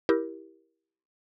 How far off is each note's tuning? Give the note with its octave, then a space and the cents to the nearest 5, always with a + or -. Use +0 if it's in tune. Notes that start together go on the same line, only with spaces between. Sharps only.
E4 -5 G4 +5 A#4 +20